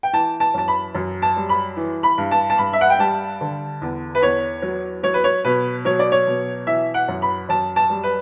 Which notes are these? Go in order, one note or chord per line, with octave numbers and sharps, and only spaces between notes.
G5
E3 A5
A5
F#2 A5
B5
F#2
A5
G3
B5
E3
B5
G2
A5
A5
G2 B5
E5
F#5
G5
G3 A5
D3
E2
B4
E2 C#5
F#3
F#3 C#5
B4
C#5
B2 B4
F#3 C#5
D5
C#5
B2
E3 E5
F#5
F#2
B5
F#2 A5
A5
G3
B4